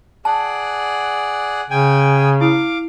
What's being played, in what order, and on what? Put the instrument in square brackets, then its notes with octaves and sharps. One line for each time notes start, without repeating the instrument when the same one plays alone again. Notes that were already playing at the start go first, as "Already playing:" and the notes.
[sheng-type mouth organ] G#4 D5 F#5 [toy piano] A5
[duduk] C#3 [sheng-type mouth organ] G5 G#5
[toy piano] E4 [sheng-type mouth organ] F5 D6